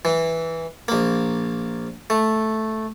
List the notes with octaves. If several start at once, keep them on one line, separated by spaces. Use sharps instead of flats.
E3
A#1 A#3
A3